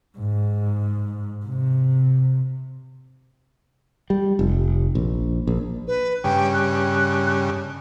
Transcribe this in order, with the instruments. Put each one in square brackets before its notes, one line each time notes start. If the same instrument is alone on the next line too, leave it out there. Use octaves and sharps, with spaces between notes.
[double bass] G#2
C3
[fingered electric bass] G3
F1
A#1
A#1
[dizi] B4
[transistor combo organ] G2 C#3 [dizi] G5
[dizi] F#6